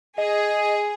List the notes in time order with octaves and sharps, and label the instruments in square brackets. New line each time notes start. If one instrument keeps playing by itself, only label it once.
[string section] G#4 [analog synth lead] D#5